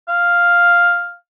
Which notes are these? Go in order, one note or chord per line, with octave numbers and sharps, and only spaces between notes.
F5